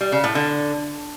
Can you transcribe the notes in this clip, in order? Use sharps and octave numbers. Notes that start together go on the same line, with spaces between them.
G3
C#3
A2
D3